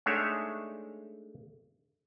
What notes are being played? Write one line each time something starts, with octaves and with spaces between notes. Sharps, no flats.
G#3 A3 D4 D#4 C#5 E5